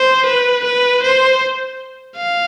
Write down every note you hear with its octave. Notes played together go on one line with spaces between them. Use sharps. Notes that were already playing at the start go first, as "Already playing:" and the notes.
Already playing: C5
B4
B4
C5
F5